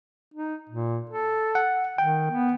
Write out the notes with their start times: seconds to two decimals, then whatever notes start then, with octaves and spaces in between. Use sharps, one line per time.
0.34 D#4
0.69 A#2
1.10 A4
1.55 F#5
1.98 D#3 G5
2.31 B3